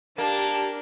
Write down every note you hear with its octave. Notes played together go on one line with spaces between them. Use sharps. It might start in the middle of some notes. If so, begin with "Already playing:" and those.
A#3 D4 G4 A5